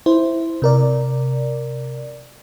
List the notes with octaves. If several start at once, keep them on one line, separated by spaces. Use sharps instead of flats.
E4 C5
C3 A#4 D5